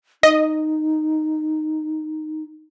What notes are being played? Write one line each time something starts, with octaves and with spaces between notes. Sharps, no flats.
D#4 D#5